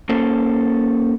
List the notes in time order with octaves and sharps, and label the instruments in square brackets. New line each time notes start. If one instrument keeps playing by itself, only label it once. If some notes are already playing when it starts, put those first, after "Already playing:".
[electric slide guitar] A#3 C#4 A4 C5